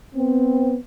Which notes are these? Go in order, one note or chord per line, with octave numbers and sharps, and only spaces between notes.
B3 C4